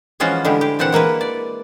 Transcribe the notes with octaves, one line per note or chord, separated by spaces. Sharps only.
E3 F3 G#3 C#4 F4 F#4
D3 G3 G#3 E4 G4
G4
A#2 E3 C4 G4 F#5 A5
G#3 A#3 E4 B4
D5